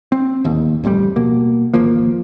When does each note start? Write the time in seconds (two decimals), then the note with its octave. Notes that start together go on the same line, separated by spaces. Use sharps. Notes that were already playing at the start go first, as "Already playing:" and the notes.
0.12 C4
0.44 D1 D#2
0.84 D1 A1 F2 G3
1.16 B2 A#3
1.74 D1 G#1 F3 A#3